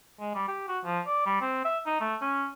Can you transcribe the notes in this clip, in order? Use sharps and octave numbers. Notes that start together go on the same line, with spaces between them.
G#3
G3
G4
F#4
F3
D5
G3
C4
E5
D#4
A3
C#4